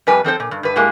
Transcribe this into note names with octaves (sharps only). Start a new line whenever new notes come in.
F2 G3 B4 G#5
F3 C4 A4 C5
A#2
G2
G2 B4
A2 G3 G#3 A#3